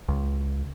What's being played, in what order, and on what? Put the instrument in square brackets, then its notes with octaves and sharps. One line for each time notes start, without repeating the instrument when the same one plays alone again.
[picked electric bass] C#2